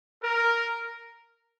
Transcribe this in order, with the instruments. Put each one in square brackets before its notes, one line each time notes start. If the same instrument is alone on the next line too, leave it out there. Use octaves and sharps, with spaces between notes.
[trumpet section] A#4